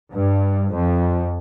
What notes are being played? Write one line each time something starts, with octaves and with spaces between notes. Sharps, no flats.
G2
F2